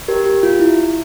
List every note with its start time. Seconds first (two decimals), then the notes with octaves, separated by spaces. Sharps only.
0.08 G4 A#4
0.26 G4
0.43 F4
0.60 E4